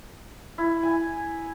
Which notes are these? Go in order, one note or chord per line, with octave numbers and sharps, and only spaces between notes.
E4
G#5